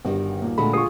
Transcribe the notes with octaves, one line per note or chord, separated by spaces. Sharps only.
G1 D#3 G3 F#4
D#2 A#2 A#3
A#2 D3 G#3 A3 F#4 B5
F4 G#4 C#6 D#6 C7